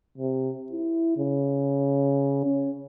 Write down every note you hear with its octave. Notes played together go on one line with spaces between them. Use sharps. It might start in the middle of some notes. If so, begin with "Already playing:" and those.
C3
E4
C#3
C#4